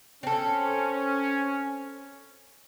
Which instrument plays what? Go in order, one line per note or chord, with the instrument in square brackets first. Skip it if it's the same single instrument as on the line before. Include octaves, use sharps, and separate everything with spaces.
[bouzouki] C4 A4 [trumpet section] C#4